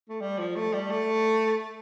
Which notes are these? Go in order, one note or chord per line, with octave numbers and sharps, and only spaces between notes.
A3
G3
F3
A3
G3
A3